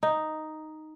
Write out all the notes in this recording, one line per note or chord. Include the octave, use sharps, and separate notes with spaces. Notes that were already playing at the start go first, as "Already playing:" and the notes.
D#4